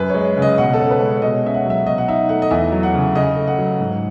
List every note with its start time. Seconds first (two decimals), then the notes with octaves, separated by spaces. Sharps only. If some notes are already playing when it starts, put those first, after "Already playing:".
Already playing: F#2 B4
0.10 G#3 C#5
0.37 C#3 D#5
0.58 B2 F#5
0.73 A4
0.80 C#4
0.91 B4
1.01 G#3
1.06 C#5
1.17 C#5
1.22 B2 D#5
1.44 C#4 E5
1.54 F#5
1.65 F#3 E5
1.86 B2 D#5
1.98 F#5
2.08 D#4 E5
2.29 A3 F#5
2.42 D#5
2.51 E2 E5
2.72 F#3
2.83 F#5
2.94 C#3
3.15 C#3 D#5
3.36 A3
3.48 F#5
3.58 F#3
3.80 G#2